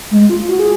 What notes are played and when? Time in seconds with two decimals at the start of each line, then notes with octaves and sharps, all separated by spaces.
0.11 G#3
0.30 F4
0.49 F#4
0.59 G#4